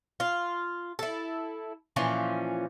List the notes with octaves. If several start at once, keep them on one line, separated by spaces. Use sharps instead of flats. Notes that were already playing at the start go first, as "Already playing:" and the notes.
F4
E4 A4
A#2 E3 F3 C#4